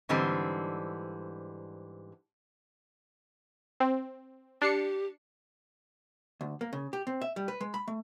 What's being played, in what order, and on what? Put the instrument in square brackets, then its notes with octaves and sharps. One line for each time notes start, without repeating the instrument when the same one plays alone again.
[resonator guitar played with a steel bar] G#2 D3 E3 G3 C4
[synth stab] C4
[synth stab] D4 C7 C#7 [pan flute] G4
[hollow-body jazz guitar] D2
A#3
C#3
G4
C4
E5
G3
B4
G#3
B5
A3